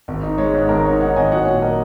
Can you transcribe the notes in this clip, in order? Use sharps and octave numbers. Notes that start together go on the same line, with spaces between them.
G#1
D#4
G#3 C#5
G#2
G#1 A#4
D#4 C#5
D#4 C#5 F#5
G#1 D#5 G#5
F#3 C#5 F#5
A#2
A#4 D#5